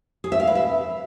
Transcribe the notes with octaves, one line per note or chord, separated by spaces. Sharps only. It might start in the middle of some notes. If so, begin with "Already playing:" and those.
G#4
E5
F5
B4
E5